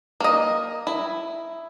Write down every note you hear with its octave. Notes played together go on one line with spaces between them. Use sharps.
A#3 D#5
E4